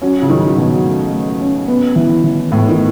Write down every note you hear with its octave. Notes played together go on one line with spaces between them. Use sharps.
F#3 C#4
C#3
D#3 F#3
B2 F#3
A3
A3
C#4
B3
E3
E3
A2 B3
D#3